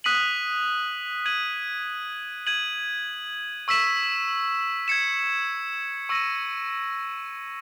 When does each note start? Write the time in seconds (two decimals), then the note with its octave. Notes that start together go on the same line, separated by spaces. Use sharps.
0.04 D#6 F#6 B6 D#7 F#7
1.26 G#6 D#7 F#7
2.46 G#6 D#7 F#7
3.68 C#6 E6 B6 E7
4.88 G#6 C#7 E7
6.09 C#6 E6 A#6 D#7